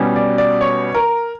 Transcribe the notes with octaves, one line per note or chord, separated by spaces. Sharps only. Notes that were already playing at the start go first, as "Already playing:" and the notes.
Already playing: B2 G3 C#4
D5
D5
C#5
A#4